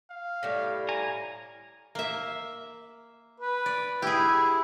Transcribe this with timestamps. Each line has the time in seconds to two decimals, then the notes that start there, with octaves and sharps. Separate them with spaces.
0.10 F5
0.43 A2 G3
0.89 G#5 A#5
1.95 A#3 E5
3.40 B4
3.66 D5
4.02 E4 G4 G#4